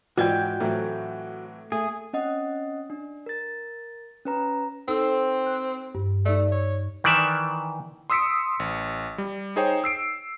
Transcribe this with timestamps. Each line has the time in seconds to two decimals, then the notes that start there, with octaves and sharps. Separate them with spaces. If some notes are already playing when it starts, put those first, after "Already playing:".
0.18 G#2 E3 F4 F#4 D5 D#5 G5
0.60 A2 E3 F#3 A3 C4
1.72 A3 G#4
2.13 C4 C#4 D#5 F#5 D#6
2.90 D4
3.26 A#4 A6
4.25 C#4 B4 A#5
4.88 C4 D#4 A4 E6
5.46 F#6
5.95 G2
6.25 A3 D#4 D5
6.52 C#5
7.04 D#3 E3 D5 E5
8.10 C6 D#6 E6 B6 C#7 D7
8.60 A1
9.18 G3
9.56 D#4 G#4 C5 C#5 G5
9.84 E6 C7 D7